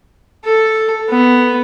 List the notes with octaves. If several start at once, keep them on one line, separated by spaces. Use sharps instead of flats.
A4
B3